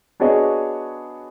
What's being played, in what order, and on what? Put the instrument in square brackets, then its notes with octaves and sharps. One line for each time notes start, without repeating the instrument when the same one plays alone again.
[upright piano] B3 D4 F#4 G#4 C#5 D#5